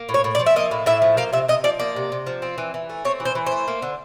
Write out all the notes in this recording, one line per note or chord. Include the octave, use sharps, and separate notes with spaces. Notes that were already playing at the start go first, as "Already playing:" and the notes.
Already playing: A#3
A2
C#5
A2
D5
F3
E5
A#3 D#5
A2
A2 E5
F3
A#3 F5
C3 E5
C3 D#5
F3 D5
A#3 D5
C3
C3
F3
C4
E3
E3
A3
C4 C#5
E3
C5
E3
A3 C5
A#3
D3